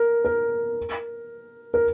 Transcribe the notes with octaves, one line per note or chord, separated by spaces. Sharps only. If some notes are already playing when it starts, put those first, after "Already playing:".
Already playing: A#4
A#4
A#4